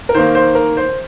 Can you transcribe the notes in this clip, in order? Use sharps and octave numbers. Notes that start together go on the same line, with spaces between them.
A#4
D#3 A#3 C5
C5
A#4
C5